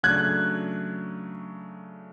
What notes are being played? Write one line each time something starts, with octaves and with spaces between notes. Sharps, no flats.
C#3 F#3 A3 D4 F#6 G#6